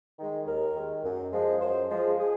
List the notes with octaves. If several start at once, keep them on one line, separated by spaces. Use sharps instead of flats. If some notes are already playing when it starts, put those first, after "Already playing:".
D#3 G#3
D#2 A#4
D#3 G#3
F#2
F3 G#3
F#2 C5
F3 G#3
G#4